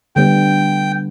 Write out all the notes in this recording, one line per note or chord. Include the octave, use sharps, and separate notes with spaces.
D3 G3 B3 G5